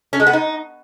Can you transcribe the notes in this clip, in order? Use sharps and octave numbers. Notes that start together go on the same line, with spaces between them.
C#4
G#3
B3
D#4